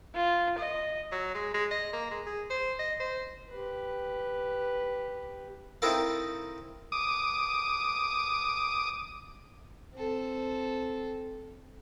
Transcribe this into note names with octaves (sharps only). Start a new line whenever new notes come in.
F4
D#5
F#3
G#3
G#3
D#5
A#3
G#3
G#4
C5
D#5
C5
G4 B4
C4 D#4 E4 A4 A#4 F5
D6 D#6
C4 A4